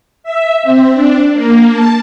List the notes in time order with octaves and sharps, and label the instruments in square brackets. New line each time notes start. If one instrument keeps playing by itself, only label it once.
[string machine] E5
C4
D4
A#3
A5